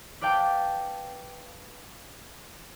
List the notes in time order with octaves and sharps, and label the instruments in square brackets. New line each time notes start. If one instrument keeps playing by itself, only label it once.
[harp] B4 D5 F5 G5 A5